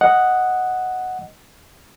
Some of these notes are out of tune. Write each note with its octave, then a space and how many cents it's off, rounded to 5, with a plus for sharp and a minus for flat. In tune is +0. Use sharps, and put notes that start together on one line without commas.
D#5 +0 F#5 +0